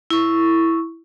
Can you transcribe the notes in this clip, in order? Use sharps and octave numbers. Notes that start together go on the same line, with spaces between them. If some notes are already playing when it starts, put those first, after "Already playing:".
E4 C#6